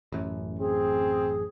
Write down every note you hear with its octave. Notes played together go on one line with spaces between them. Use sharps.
A1 F#2
C4 G#4